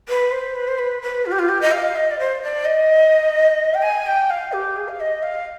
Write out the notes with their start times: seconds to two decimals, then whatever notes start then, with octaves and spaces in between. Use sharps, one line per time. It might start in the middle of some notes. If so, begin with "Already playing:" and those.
0.09 B4
0.31 C5
0.55 B4
0.67 C5
0.78 B4
1.02 B4
1.26 F4
1.31 G4
1.39 F4
1.48 G4
1.61 D#5
1.71 F5
1.96 D#5
2.11 D5
2.19 C5
2.42 D5
2.65 D#5
3.74 G5
3.82 G#5
4.06 G5
4.30 F5
4.52 G4
4.76 G#4
4.88 F5
5.00 D#5
5.22 F5